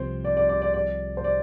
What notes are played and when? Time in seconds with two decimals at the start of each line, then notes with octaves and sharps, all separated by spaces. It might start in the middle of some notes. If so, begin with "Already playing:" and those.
Already playing: C2 C3 F3 C4 C5
0.24 D5
0.37 D5
0.49 D5
0.62 D5
0.74 D5
1.17 C5
1.24 D5